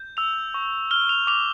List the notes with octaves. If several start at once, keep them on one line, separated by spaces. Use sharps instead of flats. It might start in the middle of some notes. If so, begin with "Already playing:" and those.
Already playing: G6
E6 F7
C#6
F6 G7
F7
D6 F7